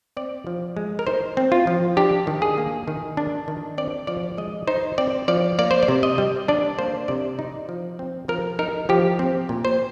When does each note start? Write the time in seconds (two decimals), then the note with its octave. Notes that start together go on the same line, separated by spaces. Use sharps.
0.17 C4 D5
0.47 F3
0.77 G#3
0.99 A#4
1.07 D#4 C5
1.37 C4
1.52 F4
1.67 F3
1.97 D4 G4
2.27 D#3
2.42 G#4
2.58 A#3
2.88 D#3
3.17 D4
3.48 D#3
3.78 C4 D5
4.07 F3 D5
4.38 G#3 D#5
4.67 D#4 C5
4.98 C4 D5
5.28 F3 D5
5.59 A#3 D5
5.71 C5
5.83 D5
5.88 C3
6.03 D#5
6.18 G3
6.48 D4 D5
6.79 A#3 C5
7.08 C3 D5
7.39 D#4
7.69 F3
7.99 C4
8.28 F3 A#4
8.59 D#4 A#4
8.89 F3 G4
9.19 C4
9.49 A#2
9.65 C5